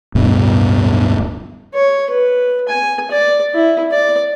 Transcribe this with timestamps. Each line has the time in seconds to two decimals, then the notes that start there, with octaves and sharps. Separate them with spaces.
0.15 D1 G2 B2
1.74 C#5
2.10 B4
2.69 G#5
3.11 D5
3.54 E4
3.92 D5